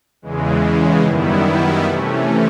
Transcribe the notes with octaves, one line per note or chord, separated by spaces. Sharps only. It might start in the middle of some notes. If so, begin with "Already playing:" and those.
E2 C#3 E3 G#3
F#2 D#3 G3 B3 E4
C3 E3 A3 C#4